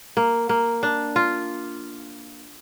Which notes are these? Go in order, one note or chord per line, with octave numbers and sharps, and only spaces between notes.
A#3
A#3
D4
F4